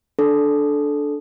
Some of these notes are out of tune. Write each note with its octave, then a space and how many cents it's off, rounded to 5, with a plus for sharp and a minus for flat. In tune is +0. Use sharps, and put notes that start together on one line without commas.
D4 +0 A4 -15